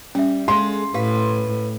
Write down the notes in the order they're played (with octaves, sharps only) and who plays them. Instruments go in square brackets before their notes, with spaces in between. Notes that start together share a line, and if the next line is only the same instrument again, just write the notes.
[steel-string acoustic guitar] G3 [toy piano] C#4 E5
[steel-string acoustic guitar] G#3 G#4 A4 [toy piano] F5 [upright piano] C6
[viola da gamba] A2 [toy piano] G4 F5 [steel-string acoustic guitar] B4